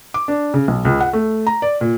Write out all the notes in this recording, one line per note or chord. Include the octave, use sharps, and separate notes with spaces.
D6
D4
C#3
B1
C#2
F#5
A3
A#5
D5
A#2